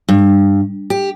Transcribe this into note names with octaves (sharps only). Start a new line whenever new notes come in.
G2
G4